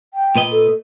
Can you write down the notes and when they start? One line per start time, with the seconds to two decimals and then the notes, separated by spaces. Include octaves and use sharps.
0.14 G5
0.36 A#2 B4 D#5
0.51 A4